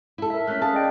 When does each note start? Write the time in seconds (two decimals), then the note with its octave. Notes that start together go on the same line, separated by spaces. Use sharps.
0.18 E4 A4
0.30 A#4 E5
0.47 A3 C#4 F6 F#6 B6
0.62 C#4 G#4 F5 A5
0.75 D5 D#5 G5